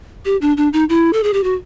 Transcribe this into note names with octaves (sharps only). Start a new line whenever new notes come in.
G4
D4
D4
D#4
E4
A4
G#4
G4
F#4